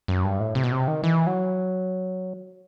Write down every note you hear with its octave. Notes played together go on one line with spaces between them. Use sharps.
F#2
G2
A2
C3
B2
C3
D#3
E3
F#3